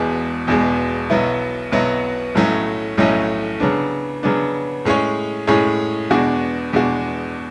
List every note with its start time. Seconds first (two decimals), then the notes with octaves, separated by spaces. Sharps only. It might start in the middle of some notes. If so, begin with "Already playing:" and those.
Already playing: E1 E2 B2 G#3
0.47 E1 E2 B2 G#3
1.10 B1 B2 F#3 B3 E4
1.72 B1 B2 F#3 B3 E4
2.35 B1 A2 F#3 A3 C#4
2.98 B1 A2 F#3 A3 C#4
3.60 C#3 F#3 B3 D4
4.23 C#3 F#3 B3 D4
4.85 A2 G#3 C#4 G#4 C#5
5.47 A2 G#3 C#4 G#4 C#5
6.10 E2 B2 G#3 D4 F#4
6.73 E2 B2 G#3 D4 F#4